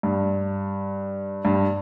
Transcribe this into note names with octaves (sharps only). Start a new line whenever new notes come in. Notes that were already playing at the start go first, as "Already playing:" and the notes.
G2
G2